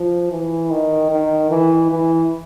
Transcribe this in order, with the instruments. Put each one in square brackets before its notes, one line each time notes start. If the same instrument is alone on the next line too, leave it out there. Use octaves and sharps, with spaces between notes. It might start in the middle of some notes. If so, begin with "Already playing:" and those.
Already playing: [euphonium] F3
E3
D#3
D#3
E3
E3